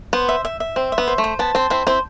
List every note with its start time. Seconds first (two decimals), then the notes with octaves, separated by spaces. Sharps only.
0.13 B3 C5
0.29 E5
0.45 E5
0.60 E5
0.76 C4 C5
0.92 E5
0.98 B3
1.08 C5
1.18 A3
1.24 C5
1.39 B3 A5
1.55 C4 C5
1.70 C4 E4 C5
1.87 C4 E4 C5